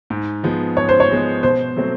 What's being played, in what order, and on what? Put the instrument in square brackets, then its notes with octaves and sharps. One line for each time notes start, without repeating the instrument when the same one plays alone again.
[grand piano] G#2
F3 G#3 B3
[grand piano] G#2 [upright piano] C#5
[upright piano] C5
C#5
[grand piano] F3 G#3 B3
[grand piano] B2 [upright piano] C5
[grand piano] F#3 A3 C4